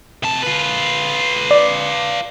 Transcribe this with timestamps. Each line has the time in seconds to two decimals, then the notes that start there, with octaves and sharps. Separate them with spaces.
0.23 C3 A5
0.42 F4 B4
1.51 D5